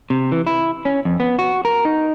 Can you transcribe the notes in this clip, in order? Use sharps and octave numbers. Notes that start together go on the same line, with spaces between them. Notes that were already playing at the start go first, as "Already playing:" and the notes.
C3
E3
E4
C#4
F2
B3
F#4
A#4
D#4